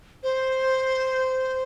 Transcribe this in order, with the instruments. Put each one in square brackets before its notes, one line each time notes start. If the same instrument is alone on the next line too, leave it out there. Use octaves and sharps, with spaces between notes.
[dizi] C5